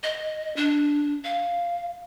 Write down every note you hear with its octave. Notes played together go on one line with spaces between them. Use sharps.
D#5
D4
F5